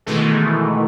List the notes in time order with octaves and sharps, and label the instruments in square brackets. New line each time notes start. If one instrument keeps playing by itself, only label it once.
[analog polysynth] B2 D#3 E3 G#3 A3